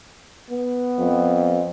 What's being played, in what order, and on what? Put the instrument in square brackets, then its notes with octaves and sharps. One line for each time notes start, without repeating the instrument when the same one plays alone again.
[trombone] B3
[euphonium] F2